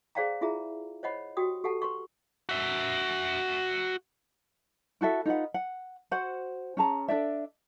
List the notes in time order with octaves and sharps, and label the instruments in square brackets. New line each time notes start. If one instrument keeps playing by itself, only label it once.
[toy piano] G#4 C5 D5 F5 G5 A#5
E4 F4 G#4 E5 A#5
C5 C#5 D#5 F#5 B5
F#4 G4 G5 D#6
G4 A4 F#5 A5
B4 C6 C#6
[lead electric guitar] F#4 E5
[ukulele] E4 F#4 A4 E5
D#4 F4 B4 F#5
F#5
F#4 C5 F#5
C#4 G#4 A5 A#5
D4 A4 D5 E5